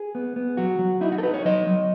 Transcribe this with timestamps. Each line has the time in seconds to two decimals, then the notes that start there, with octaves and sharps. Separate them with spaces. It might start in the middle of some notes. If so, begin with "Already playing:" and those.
Already playing: G#4
0.15 B3
0.36 B3
0.57 F#3 F#4
0.79 F#3
1.01 D#4 E4
1.12 F#4
1.18 A4
1.23 D#4 B4
1.34 C#5
1.45 F#3 D#5
1.67 F#3